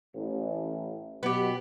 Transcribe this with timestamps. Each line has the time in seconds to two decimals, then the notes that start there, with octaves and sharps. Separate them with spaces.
0.15 A1
1.23 B2 F#3 B3 G4